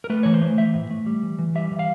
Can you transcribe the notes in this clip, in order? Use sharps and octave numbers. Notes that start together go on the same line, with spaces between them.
A#4
A3 B4
E3 C#5
C5
A3
E3 E5
A2
A3
G3
E3
E3
G3 E5
E3
F5